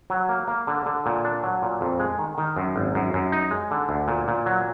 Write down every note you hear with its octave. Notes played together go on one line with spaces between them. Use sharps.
F#3
A#3
A#3
D3
D3
A#2
D4
F#3
A#2
F2
G#3
D#3
D#3
F#2
G#1
F#2
F#2
D#4
G#3
D3
D2
A#2
A#2
F#3